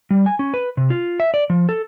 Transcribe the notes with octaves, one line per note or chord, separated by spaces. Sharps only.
G3
G#5
C#4
B4
C3
F4
E5
D5
F3
A4